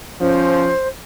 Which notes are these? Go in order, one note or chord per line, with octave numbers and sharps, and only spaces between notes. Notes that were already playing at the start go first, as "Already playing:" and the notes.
F3 C#4 C5